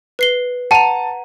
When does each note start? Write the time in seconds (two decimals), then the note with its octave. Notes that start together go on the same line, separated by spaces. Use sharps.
0.19 B4 C7 G7
0.71 F#5 A5 A#5 D#7